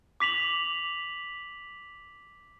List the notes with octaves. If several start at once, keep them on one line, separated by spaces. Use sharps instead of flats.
D6 B6 F7 F#7